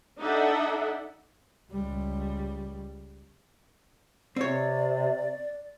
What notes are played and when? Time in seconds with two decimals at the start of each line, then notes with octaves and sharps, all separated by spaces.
0.21 D4 D#4 A4 D5 E5 F#5
1.72 C#2 G3
4.36 C3 C4 C#5 D5